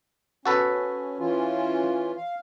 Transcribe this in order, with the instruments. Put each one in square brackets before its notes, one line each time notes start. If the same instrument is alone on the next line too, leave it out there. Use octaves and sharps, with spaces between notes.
[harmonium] C#4 [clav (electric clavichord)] F#4 A4 B4
[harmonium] E3 C#4 F4
F5